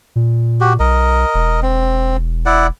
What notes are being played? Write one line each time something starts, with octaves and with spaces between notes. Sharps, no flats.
A#2
F#4 G4
B1 A#4 D#5
E1
C4
E4 D5 F#5